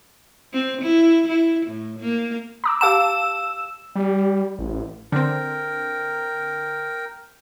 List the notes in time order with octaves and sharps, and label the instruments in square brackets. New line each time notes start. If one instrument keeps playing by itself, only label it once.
[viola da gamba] C4
E4
E4
A2
A#3
[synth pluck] A#5 D6 E6
[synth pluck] G4 F5 A5 [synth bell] E6 E7
[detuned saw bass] G3
A1
[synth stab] D3 C4 [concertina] A#4 G5